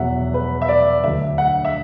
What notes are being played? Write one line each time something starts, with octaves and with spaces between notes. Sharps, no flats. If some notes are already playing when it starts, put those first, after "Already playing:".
Already playing: E2 B2 F#3 E5 F#5
B4
E5
D5
D2 D3 F#3 E5
F#5
E5